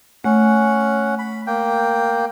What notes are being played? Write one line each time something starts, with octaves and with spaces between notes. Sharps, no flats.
A3 C#4 F#5
B5
A#3 G5